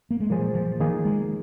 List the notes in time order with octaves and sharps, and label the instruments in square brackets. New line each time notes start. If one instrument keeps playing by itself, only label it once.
[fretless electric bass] A#3
G#3
[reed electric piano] A#2 A#3 G#4 C5 [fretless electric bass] F3
[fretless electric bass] F3
[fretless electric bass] D#3 [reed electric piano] F3 A#3 D#4 G#4
[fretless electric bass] G#3